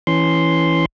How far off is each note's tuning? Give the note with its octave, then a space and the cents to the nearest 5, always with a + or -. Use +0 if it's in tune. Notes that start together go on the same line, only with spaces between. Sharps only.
E3 +0 C#4 +0 C6 +0